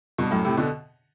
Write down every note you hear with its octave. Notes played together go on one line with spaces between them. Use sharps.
G2 B2
F#2 A2
A2 C3
B2 D3